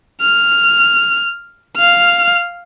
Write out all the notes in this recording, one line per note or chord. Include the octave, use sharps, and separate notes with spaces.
F6
F5 F6